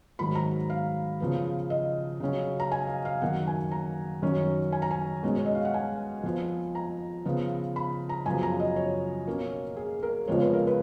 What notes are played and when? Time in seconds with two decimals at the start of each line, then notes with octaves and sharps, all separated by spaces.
0.19 G#2 D#3 F#3 B5
0.35 A#5
0.70 F5
1.20 C#3 F3 B3
1.70 D#5
2.20 C#3 F#3 C#4
2.60 A#5
2.72 G#5
2.87 F5
3.05 F5
3.22 F#2 D#3 F#3 A#3 F#5
3.47 G#5
3.71 A#5
4.22 F#2 D#3 F#3 C#4
4.72 G#5
4.82 A#5
4.91 G#5
5.23 B2 G#3 C#4
5.37 C#5
5.46 D#5
5.55 F5
5.65 F#5
5.74 G#5
6.24 F2 F3 B3
6.75 A#5
7.25 C#3 F3 B3
7.76 B5
8.09 A#5
8.26 F#2 C#3 F3 B3 G#5
8.43 A#5
8.60 D#5
8.76 C#5
9.27 B2 A#3 C#4
9.77 G#4
10.03 A#4
10.27 F2 C#3 F3 G#3 B3 C#5
10.41 B4
10.54 A#4
10.67 B4